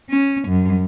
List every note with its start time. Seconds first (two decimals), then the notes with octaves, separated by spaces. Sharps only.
0.10 C#4
0.48 F#2